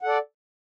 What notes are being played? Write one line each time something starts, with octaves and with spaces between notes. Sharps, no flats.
A4 D5 F#5